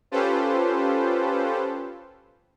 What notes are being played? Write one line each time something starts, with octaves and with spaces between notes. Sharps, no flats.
C#4 F4 G4 A4 B4 C5